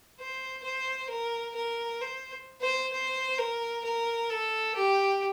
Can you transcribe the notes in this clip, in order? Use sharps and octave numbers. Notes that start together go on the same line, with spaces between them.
C5
C5
A#4
A#4
C5
C5
C5
A#4
A#4
A4
G4